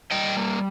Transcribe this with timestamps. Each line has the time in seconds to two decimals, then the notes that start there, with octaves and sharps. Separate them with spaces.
0.11 G3 D#5 G5
0.37 A#3